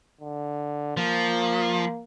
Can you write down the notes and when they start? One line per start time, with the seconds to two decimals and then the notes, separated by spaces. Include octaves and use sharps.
0.21 D3
0.97 F3 A#3